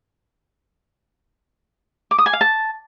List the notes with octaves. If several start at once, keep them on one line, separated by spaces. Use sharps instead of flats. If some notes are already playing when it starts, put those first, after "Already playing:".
D6
D#6
G#5
F5
A5